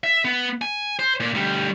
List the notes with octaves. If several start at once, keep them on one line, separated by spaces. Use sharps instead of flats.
E5
B3
G#5
C5
A#2
D2 G3